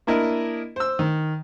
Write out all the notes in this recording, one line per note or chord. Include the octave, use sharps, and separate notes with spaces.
A#3 D4 E4 A#4 D#5
C5 E6
D#3